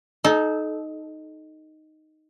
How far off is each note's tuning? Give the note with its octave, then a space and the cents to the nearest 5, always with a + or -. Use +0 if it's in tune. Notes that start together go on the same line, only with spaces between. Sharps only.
D#4 +0 A4 -35